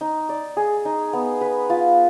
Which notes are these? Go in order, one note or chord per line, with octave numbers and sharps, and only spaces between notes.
D#4
D5
G#4
D#4
B3
B4
F4